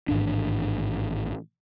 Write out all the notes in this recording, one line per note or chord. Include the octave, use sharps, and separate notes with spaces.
A1 G#2 D#3 D4